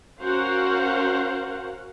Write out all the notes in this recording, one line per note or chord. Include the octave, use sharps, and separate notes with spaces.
C#4 F#4 A#4 C5 F5 F#5